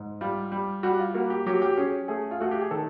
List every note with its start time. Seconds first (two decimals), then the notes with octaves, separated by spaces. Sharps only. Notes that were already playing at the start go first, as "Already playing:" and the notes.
Already playing: G#2
0.21 G3 F4
0.52 G3
0.83 G3 F#4
0.99 F4
1.14 A#3 F#4
1.30 G4
1.46 F#3 G4
1.62 G4
1.77 C#4 G#4
2.08 A3 G#4
2.31 F4
2.40 A3 F#4
2.51 G4
2.62 G#4
2.71 D#3 A4